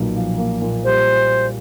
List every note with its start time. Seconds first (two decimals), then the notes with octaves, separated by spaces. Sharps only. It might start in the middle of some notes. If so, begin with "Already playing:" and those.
Already playing: B1 A#2 A#3
0.16 F3
0.38 A#3
0.62 A#2
0.84 G3 C5